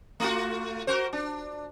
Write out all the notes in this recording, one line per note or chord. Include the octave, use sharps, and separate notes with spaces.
A3 F4 F#4
F#4 A#4 C5
D4